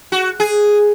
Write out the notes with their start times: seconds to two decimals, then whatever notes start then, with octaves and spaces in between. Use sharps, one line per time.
0.12 F#4
0.40 G#4